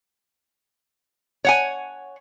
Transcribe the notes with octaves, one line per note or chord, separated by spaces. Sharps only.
C#5 F#5 G#5